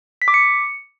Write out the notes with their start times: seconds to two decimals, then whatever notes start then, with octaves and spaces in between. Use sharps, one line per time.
0.22 B6
0.28 D6
0.34 C#7